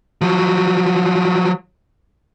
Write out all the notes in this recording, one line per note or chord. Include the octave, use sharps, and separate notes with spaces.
F3 F#3